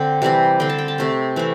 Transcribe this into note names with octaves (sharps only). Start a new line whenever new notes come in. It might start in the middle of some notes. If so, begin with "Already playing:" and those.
Already playing: D3 C4
C3 E3 G3 C4
D3 C4 G5
A5
G5
A5
C3 A3 C4
E3 A3 C4